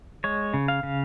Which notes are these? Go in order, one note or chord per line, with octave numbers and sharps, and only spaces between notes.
G#3 C#5
C#3
F5
C#3